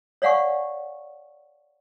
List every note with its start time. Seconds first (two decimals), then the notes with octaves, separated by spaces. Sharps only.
0.22 C#5 D5 F5 F#5 G#5 C#6